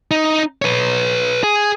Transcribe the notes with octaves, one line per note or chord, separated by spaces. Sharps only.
D#4
B4 C#5
G#4